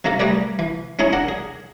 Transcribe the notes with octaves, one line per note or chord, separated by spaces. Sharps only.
C3 D#3 A#3 A4 A#4
G3 A3 G#4 A#4 B4 D5
E3
G#3 C#4 D#4 E4 G#4 C#5
D4 A#4 F#5
G#4